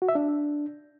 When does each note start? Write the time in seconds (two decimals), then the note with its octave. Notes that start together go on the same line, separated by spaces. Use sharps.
0.02 F#4
0.09 E5
0.15 D4